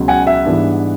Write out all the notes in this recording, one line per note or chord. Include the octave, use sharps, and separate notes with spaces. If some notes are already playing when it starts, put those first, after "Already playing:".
Already playing: C#2 B2 F#3
F#5 G#5
E5 F#5
G#2 E3 G3 B3 D4